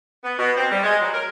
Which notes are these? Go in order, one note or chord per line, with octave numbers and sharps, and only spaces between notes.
B3
B2
C4
G3
G#3
F#3
A#4